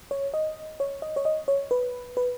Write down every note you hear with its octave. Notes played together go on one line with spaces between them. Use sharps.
C#5
D#5
C#5
D#5
C#5
D#5
C#5
B4
B4